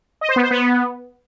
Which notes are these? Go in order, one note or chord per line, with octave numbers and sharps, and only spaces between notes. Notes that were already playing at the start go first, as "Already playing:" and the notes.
D#5
C5
B3
C5
B3